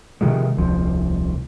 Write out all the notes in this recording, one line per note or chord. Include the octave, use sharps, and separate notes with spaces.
C3 D#3 F3 G#3
D#1 C2 F3